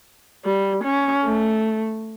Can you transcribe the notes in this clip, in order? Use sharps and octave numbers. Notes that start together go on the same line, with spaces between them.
G3
C#4
A3